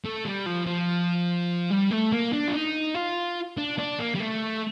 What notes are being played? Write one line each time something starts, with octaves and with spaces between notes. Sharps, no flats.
A3
G3
F3
F3
G3
A3
A#3
D4
F4
D#4
F4
D4
D4
A#3
G3
A3